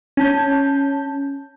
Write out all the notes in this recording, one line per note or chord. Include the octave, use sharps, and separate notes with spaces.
C#4 A5 G6